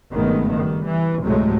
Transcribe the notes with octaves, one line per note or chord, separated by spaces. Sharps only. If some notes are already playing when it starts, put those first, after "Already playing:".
F#1 G2 D#3 G#3 A3 B3
D#3 G3
E3
D2 A2 C3 F#3 G#3 A3